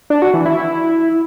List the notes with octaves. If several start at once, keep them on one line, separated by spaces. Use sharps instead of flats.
D4
F#4
E3
E4
E4